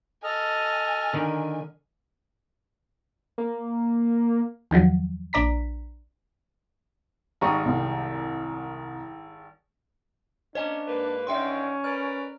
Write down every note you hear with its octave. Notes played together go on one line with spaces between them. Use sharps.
A4 D#5 G#5 F6
D3 D#3 A#4
A#3
E2 D#3 F3 F#3
A#1 D4 D5 A#5 B6
G#1 G3 A#5 C#6 D#6
C2
A#3 C#4 D4 C5 D#5 G#5
G#2 A#3 B4
G2 D3 D#3 C#4 E5 G5 C6
A#4 B4 D5 F6